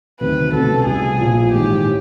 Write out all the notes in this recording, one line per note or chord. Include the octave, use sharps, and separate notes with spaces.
D2 C3 D#3 F#3 A3 B4
C2 B2 F#3 A3 C#4 A4
C2 B2 G3 B3 G#4
A#1 A#2 F3
A1 G#2 D#3 G#3 G4
A2